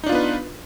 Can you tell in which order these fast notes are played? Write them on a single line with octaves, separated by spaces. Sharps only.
D#4 D4 F4 B3 B4